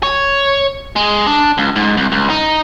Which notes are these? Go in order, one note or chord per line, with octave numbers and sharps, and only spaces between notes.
C#5
G#3
D4
C#2
G#2
C2
C#2
D#4